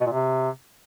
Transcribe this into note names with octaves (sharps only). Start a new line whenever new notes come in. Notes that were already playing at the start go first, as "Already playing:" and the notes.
B2
A#2
C3